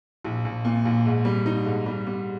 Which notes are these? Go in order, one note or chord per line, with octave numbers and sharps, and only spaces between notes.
A#1
A#1
A#2
A#1
G#2
G3
D#4
G#2
G3
G3